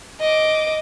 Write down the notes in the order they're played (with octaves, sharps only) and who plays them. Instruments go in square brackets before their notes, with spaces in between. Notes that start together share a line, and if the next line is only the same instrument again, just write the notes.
[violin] D#5 D6